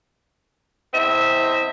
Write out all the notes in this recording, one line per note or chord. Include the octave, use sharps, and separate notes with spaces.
E2 C4 D#5 E5